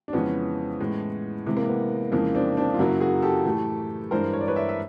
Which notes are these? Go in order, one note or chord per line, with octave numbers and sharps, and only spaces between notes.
D4
F2 C#3 E3 G#3 B3 C#4
A2 E3 G#3
C3 E3 G#3
A#3
B3
F2 C#3 E3 G#3 A#3
C4 D4
C4 D4
F4
F#2 C#3 F#3 A#3 E4 F#4
F#4 G#4
G4 A4
A2 E3 A3
G2 E3 G#3 A#4 C5
C#5
D5
B4 C#5
D5 E5
E5